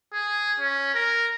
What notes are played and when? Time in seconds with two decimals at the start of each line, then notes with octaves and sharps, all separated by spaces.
0.14 G#4
0.60 C#4
0.95 A#4